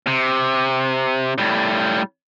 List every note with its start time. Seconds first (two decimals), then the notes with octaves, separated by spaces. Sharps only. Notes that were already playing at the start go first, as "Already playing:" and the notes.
0.07 C3
1.38 A2 G3